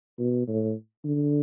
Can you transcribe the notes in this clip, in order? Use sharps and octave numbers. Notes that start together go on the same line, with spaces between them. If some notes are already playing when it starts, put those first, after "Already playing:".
B2
A2
D3